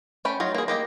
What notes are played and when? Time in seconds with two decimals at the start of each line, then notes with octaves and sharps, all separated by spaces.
0.25 A3 C#4 G5 B5
0.40 F#3 D#4 F4
0.55 A#3 G#4
0.68 A#3 G4 D#5